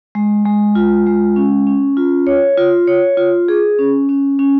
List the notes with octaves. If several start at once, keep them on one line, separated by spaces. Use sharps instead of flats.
G#3
G#3
F4
G#3
C#4
C#4
F4
C#5
F4
C#5
F4
G#4
C#4
C#4
C#4